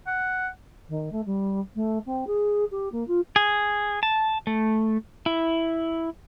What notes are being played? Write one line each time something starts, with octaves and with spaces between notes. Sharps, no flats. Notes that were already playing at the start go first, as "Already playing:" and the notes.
F#5
D#3
A3
G3
A3
C4
G#4
G4
A#3
F4
G#4
A5
A3
E4